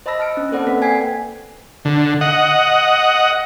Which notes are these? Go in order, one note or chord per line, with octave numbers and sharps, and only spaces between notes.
C5 D#5 A5 B5 E6 A#6
A5 F6 C#7 D7
C#4
A#3 C4 A4 C5 D5 F#5
A#3 C4 A4 B4 B6
G5 G#5 G#6 B6 C7
D3
D#5 F#5